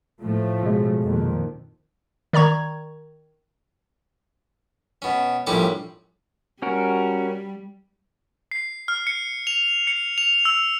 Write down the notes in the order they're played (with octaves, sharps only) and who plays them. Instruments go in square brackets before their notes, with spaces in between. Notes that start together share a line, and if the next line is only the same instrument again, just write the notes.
[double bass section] A2 F3 A3
[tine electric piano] B2 G#3
[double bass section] F2 A#2 D#3
[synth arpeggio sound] D#3 D5 A#5 C#6 G#6
[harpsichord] B2 C#4
A#1 A2 G3 C#4 C#6 D6
[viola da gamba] G3 [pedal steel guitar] C#4 F#4 A#4
[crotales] C7
F6
C#7
F7
C#7
F7
E6